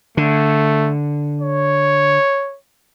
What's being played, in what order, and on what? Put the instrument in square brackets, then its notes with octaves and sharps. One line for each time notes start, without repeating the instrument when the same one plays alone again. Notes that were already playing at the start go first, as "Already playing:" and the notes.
[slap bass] D3 [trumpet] A3
[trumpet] C#5